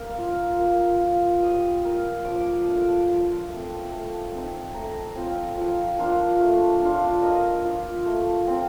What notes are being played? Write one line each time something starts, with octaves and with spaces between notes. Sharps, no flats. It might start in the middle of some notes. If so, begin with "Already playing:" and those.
Already playing: A#3
F4
A#3
F4
G3 D#6
A#3 F4
F3 D6
D#6
A3 D4 F4
D6
F3 C6
A3 C4
A3
C4 D#4
A3 A#5
C4 F4
F3 F5
A#3 D4 F4
A3
D4 F4
A#3 D#5
F4
A3
C4 F4